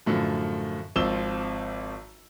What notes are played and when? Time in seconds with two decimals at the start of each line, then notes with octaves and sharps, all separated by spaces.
0.06 F#2 A2 D3 F3
0.96 G#1 F3 C4 E6 E7 G7